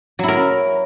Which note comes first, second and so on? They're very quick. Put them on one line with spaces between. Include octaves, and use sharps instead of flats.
F#3 E4 A#4